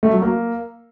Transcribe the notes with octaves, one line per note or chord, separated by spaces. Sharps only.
A3
F#3
A#3